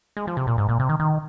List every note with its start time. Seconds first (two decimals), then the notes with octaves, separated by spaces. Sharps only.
0.17 G#3
0.27 F3
0.37 C3
0.47 A#2
0.58 G#2
0.69 A#2
0.80 C3
0.89 D#3
1.00 D#3